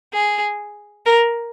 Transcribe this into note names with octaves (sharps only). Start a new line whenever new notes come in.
G#4
A#4